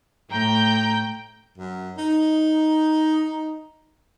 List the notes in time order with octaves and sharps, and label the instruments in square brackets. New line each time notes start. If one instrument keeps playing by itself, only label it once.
[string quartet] A2 [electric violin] G5 G6 [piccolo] A#5
[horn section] F#2
D#4